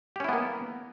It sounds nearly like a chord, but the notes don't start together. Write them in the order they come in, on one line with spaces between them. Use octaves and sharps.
G4 C#4 E4 B3 A#3